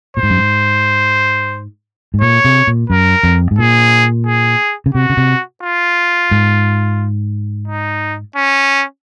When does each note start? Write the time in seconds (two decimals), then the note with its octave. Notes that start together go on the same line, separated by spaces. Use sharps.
0.17 A#2 C5
0.23 G#2
0.30 F#2
0.37 G#2
2.14 G#2
2.21 A#2 C#5
2.45 C3
2.67 A#2
2.90 F#2 A#4
3.23 F2
3.51 G#2
3.58 A#2 G#4
4.27 G#4
4.86 C#3
4.94 C3 F#4
5.10 C#3
5.17 C3
5.63 F4
6.31 G#2
7.68 D#4
8.36 C#4